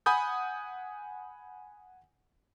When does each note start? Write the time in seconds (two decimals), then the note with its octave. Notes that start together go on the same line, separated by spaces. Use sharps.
0.06 F#5 G#5 B5 D#6 G6